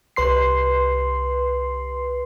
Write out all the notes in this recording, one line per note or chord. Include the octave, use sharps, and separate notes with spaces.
C2 B4 C6 C7